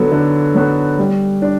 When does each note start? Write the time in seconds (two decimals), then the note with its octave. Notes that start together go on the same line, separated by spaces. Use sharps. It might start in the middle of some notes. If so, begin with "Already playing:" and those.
Already playing: D3 F#3 B3 F#4 A4
0.12 D3
0.55 F#3 B3 F#4 A4
0.98 G3
1.42 D4